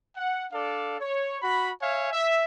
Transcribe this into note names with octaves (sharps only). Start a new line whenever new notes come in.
F#5
D4 A4 D5 F5
C#5
F#4 B5
C#5 E5 F5 G#5
E5